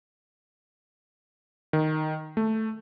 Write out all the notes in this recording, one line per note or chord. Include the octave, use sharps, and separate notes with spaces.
D#3
A3